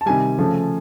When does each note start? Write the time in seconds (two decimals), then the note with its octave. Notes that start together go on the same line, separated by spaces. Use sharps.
0.01 A5
0.06 C3 D#3 G3 G#5
0.38 C#3 F3 A3